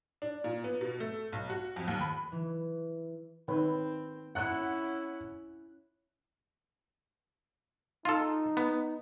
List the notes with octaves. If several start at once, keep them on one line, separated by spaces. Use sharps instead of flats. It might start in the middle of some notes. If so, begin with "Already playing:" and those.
D4
A#2
B3
B2
A3
B1
F#4
F2
D#2
B5
E3
D#3 C4 B4 C#5
C#4 E4 F#5 F#6
D#4 F4 A4
B3